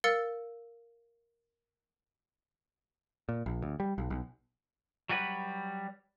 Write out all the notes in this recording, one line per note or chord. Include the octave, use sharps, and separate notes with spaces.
A#4 F5 E6 A6 C#7
A#2
A#1
D2
G3
B1
B1
F#3 G3 F#4 B4